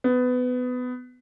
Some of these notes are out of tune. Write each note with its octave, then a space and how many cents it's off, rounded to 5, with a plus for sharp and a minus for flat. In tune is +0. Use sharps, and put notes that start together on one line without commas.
B3 +20